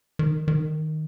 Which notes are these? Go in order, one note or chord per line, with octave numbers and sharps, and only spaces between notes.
D#3
D#3